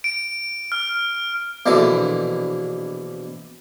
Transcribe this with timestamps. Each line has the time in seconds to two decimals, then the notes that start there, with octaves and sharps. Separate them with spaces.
0.04 D7
0.72 F6
1.66 A#1 B2 D3 E3 D6